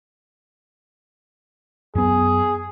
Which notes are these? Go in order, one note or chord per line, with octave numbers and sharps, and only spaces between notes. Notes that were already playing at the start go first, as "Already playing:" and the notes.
F#2 B3 G#4